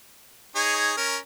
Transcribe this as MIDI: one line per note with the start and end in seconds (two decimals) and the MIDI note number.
0.55 0.93 63
0.55 0.93 68
0.55 0.93 73
0.97 1.17 61
0.97 1.17 70